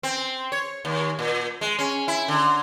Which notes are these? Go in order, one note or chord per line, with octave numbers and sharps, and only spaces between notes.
C4
C#5
D#2
A#2
G#3
C#4
E4
D3